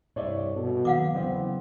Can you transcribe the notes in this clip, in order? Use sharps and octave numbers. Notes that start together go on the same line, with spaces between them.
C2 G2 C#5 D5 E5
B2 A4
D#3 F#3 A#3 F5 F#5 D6
E2 C#3 F#3 B3 C4